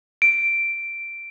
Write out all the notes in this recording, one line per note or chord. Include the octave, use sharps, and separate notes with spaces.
D7